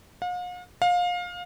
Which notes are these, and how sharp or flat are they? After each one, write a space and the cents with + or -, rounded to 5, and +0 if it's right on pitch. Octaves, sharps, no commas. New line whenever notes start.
F5 +45
F5 +25